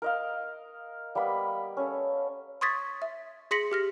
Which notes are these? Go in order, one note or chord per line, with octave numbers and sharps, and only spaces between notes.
A#4 D#5 F5
G3 A#3 B3 B5
C#4 A4
C6 C#6 D#6 G#6 A6 B6
E5
G#4 C6 A#6 B6 C#7 F#7
G4 F6 A#6